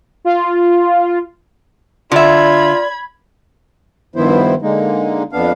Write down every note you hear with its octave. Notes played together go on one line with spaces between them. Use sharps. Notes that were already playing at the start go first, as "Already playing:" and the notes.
F4
D3 F4 D5 E5 B5 G#6
G2 D#3 F3 B3 E4 C5
D3 G#3 A#3 D#4
F2 B3 D4 F5